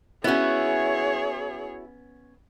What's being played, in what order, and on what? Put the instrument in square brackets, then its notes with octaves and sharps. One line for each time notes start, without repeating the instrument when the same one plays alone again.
[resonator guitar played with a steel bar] B3 C#4 [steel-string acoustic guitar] E4 F#4 [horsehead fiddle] G#4 C#5